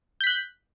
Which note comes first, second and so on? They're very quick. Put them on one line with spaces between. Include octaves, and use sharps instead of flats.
G6 B6 F#6